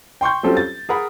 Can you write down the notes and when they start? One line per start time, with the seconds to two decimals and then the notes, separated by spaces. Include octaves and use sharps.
0.21 G5 C6 C#6 G6
0.43 F#3 G3 C4 C#4 F4 A4
0.57 A6
0.89 G#4 A#4 F#5 B5